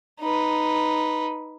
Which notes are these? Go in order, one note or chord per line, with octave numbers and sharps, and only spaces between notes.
D#4 B4